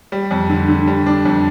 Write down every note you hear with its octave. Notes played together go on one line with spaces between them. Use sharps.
G3
F2
D3
D3
G3
D4
F2